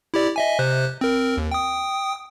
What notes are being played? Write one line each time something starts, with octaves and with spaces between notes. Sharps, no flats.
E4 G4 D5
D#5 E5 G#5
C3 C5 F#6
C4 A#4
D#2
G5 D#6